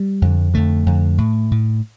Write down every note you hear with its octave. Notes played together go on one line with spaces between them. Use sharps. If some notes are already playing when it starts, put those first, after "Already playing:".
Already playing: G3
F2 D3
F2 D3 A3
F2 D3
A2
A2